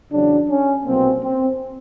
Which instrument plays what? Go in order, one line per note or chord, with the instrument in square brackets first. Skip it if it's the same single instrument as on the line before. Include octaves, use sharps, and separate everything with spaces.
[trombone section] E2 C#3 F#3 D4
C#4
C2 B2 F#3 A#3 C4
C4